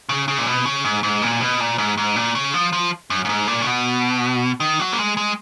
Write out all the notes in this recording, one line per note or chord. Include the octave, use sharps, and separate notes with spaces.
C#3
C#3
A#2
B2
C#3
G#2
G#2
A#2
B2
A#2
G#2
G#2
A#2
C#3
F3
F3
F#2
F#2
G#2
A#2
C#3
B2
D#3
F#3
A#3
G#3
G#3